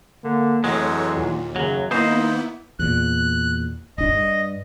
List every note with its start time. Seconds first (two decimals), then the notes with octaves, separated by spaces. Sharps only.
0.24 D3 A#3
0.64 F2 E3 F#3 G#3 A3 C#5
1.16 D#2 A#2
1.56 F#2 C#3 F#3
1.91 D#3 A#3 B3 D#4 E4 C5
2.79 E2 A#2 F#6
3.98 D1 G1 D4 D#5
4.14 G2